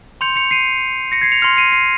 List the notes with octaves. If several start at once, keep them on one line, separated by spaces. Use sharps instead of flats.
C6 G6 C#7 F7
C#7 F7
C7 D#7
A#6 C#7
G#6 C7
C#7 F7
C6 F6 C#7 F7
C7 D#7
C7 D#7